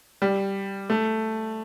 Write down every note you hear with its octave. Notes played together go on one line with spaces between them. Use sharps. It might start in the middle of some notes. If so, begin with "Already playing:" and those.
G3
A3